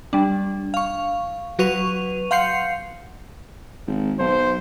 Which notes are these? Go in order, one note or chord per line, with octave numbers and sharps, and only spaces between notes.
G3 D4
F5 C#6
F#3 F#4 B4 C#6 D#7 F7
F5 F#5 C6 G6 C7 C#7
G#1
B1 C5